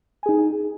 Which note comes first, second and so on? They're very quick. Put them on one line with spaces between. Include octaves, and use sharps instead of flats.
G#5 G#4 D#4